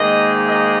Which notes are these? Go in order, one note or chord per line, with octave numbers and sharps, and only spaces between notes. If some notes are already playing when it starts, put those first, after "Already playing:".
Already playing: G#2 D#3 A#3 D#5
D#5